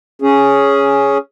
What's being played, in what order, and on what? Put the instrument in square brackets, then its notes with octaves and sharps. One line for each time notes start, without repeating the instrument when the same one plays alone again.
[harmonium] C#4 G#4